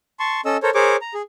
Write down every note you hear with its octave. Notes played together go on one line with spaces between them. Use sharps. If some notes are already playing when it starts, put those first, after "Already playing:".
A5 C6 C#6
C#4 A4 D#5 E6
A4 A#4 C5 C#5
G#4 A#4 C5 C#5 D6
A#5
G#4